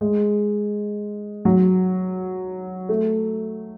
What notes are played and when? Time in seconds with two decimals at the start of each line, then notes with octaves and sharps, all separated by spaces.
0.01 G#3
1.45 F#3
2.89 A3